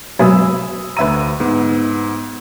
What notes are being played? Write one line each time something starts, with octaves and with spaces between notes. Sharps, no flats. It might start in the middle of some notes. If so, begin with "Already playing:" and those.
F#2 B2 G#3 B5 D#6 E6
D2 B4 E5 A#5 E6 D#7
G#2 B3